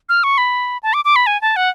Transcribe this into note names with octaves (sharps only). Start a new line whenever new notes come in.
F6
C#6
B5
A5
D6
D6
B5
G#5
A5
F#5